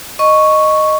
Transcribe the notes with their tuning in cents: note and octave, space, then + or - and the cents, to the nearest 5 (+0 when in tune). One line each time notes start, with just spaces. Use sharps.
D#5 -10 C#6 +0